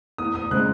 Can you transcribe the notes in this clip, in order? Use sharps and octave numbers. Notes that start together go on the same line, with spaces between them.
E2 D#6
D#6
C#3 G#3 C4 F#6